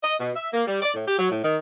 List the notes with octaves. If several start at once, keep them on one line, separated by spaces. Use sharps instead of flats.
D#5
B2
E5
A#3
G3
D5
A2
G4
F#3
A2
D#3